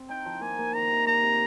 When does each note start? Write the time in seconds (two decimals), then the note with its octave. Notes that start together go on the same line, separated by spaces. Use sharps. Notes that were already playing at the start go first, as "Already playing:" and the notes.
Already playing: C4
0.09 D#4 G5
0.26 F3
0.41 A#3 G#5
0.59 A#3
0.74 D#3 A#5
0.91 C3
1.07 A#3 A#5
1.23 C3